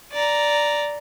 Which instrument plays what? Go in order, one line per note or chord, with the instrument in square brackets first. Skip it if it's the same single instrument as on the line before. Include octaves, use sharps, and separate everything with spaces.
[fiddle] D5 A#5